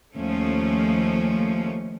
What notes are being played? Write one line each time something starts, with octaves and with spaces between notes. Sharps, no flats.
D#2 F3 A3 C#4